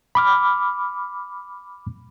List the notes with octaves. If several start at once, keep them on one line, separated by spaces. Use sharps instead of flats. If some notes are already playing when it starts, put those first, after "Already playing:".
B5 D6 F6